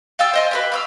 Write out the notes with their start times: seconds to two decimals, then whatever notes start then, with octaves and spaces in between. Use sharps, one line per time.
0.19 F5 G5 A5 E6
0.33 C5 D#5 G#5
0.51 G4 A#4 B4
0.72 F5 D6 E6